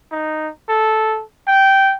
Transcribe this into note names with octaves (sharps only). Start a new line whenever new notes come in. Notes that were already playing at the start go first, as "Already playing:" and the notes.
D#4
A4
G5